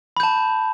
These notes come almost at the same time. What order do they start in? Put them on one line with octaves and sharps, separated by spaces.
B5 G6 A5